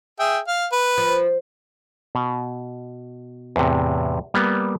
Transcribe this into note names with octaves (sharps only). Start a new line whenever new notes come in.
G#4 E5 G5
F5
B4
F3
B2
E2 A2 C3
G3 A#3 B3